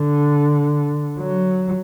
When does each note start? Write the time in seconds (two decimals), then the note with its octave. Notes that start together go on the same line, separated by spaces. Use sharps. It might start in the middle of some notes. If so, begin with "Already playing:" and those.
Already playing: D3
1.19 F#3